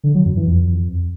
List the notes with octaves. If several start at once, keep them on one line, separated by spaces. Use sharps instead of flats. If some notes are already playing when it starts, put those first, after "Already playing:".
D3
F#3
F#2
E3
F2